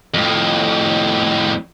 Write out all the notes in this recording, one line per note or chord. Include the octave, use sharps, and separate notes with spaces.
F2 A2